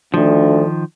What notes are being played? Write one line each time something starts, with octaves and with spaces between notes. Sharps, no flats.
D2 D#3 F3